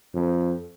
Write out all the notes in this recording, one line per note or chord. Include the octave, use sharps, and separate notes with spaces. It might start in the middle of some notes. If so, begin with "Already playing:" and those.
F2